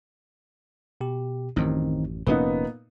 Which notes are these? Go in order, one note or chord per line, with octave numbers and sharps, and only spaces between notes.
B2 G4
A1 F#2 D#3 C4 D#4
F1 A#2 F3 B3 C#4 D#4 B4